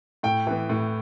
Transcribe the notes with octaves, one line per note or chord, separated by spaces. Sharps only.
A2 G5
E3 B3
A2